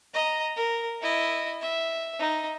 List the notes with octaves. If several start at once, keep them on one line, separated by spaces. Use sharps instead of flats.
D#5 A#5
A#4
E4 D#5
E5
D#4